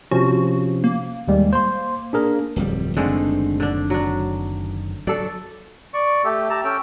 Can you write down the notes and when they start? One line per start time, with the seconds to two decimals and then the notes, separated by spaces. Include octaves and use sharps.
0.11 C3 F3 C#4 F#4
0.84 A#3
1.28 D#2 G3 G#3
1.53 C5 C6
2.13 D4 G#4 A#4
2.56 D1 F2 G3
2.97 F#1 D3 D#3 G#3 A3 C4
3.60 D3 D4
3.90 F#3 D4
5.07 F#3 A4 D5
5.94 D5 C#6
6.24 A3 G4 A4
6.50 G4 A5 A#5
6.64 C#4 A4 G5